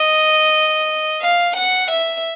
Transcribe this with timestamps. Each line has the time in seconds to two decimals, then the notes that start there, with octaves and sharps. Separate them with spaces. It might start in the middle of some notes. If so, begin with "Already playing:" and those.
Already playing: D#5
1.21 F5
1.56 F#5
1.91 E5